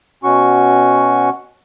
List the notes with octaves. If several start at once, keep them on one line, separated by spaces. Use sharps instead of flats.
B2 C#4 F#4 C#6